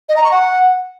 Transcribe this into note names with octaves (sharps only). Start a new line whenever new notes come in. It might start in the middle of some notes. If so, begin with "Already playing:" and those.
D#5
A#5
C#6
F#5